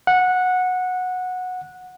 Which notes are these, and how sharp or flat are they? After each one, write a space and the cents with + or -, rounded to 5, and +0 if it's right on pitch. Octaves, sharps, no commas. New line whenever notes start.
F#5 -15